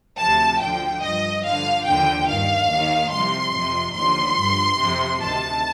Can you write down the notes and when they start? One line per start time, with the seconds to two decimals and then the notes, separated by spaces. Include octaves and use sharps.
0.19 D2 C3 F3 A5
0.61 D2 D3 F3 G5
1.03 G2 F3 D#5
1.45 G2 D3 F3 F5
1.87 D#2 D3 F3 G5
2.28 G2 D#3 F5
2.70 D#2 D#3
3.12 C2 C3 F3 C6
3.54 F2 C3 F3
3.95 D#2 D3 F3 C6
4.38 G2 F3
4.79 F2 C3 F3
5.21 D2 C3 D#3 A5